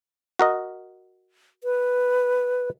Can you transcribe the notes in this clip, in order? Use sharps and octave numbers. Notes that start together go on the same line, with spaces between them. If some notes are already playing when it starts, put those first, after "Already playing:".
F#4 A#4 D#5
B4